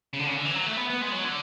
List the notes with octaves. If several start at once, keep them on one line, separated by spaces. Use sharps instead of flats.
C#3
D3
C#3
D3
E3
F#3
A3
B3
B3
G#3
F#3
D3